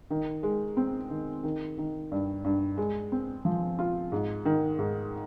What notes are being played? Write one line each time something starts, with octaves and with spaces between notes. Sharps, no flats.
D#3
G#3
C4
D#3
D#3
D#3
G2
G2
G#3
C4
F3
F4
G#2
D#3
G#2